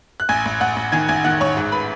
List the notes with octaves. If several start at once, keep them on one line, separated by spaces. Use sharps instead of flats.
F#6
A1 G#5 G#6
A1
A1 F#5 F#6
A1
D#3 G#5 G#6
A1 G#5 G#6
D#3 F#5 F#6
A1 C#5 C#6
G#2
B4 B5